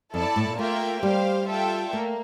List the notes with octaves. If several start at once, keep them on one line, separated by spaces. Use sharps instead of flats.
F2 E4 A4 D5 A5
A2
A#2
A3 A#3 F4 A#4 E5 G5
G3 G4 C5 F5
F4 A4 E5 G5
A3 A#3